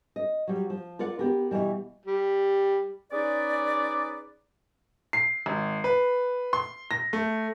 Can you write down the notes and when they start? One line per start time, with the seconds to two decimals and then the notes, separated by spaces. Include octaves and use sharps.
0.16 D#5
0.47 F#3 G3
0.70 F3
0.99 F4 A#4 D5 F#5
1.19 B3 G4 A#4
1.51 B2 E3 G3
2.05 G3
3.12 C#4 D#4 G#4 B4 D5
5.13 C7
5.46 G#1
5.84 B4
6.53 C6
6.91 A#6
7.13 A3